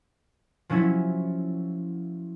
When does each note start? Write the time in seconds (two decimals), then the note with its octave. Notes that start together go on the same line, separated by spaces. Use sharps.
0.70 F3 F#3 C#4 E4